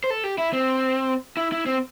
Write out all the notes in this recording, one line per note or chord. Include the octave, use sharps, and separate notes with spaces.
C5
A4
G4
E4
C4
E4
E4
C4